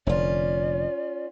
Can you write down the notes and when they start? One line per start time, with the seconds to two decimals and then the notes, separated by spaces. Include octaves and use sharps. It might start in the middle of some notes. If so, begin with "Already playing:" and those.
0.07 F1 D3 C#4 F4 D5